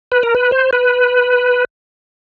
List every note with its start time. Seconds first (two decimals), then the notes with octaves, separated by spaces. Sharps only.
0.12 B4
0.23 A#4
0.35 B4
0.52 C5
0.73 B4